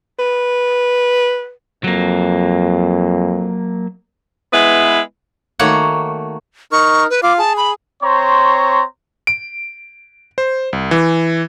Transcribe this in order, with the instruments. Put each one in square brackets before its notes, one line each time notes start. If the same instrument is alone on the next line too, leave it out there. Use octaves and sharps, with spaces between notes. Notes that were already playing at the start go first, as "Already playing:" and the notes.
[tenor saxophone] B4
[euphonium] F2 [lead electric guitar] F#3 A#3
[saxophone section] G#3 B3 E4 B4
[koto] D#3 A3 A#3 F#4 C#5 F#5
[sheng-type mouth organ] D#4 A#4 [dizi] C#6
[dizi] B4
[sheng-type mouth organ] F4 F5 [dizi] D6
[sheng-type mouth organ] G#4 [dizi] A5
[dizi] B5
[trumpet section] C4 C5 C#5 A#5 C6 C#6
[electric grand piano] D7
C5
C2
E3